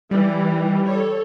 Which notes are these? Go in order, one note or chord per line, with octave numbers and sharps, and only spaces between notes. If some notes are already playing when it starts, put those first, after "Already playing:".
E3 G3
A4 C#5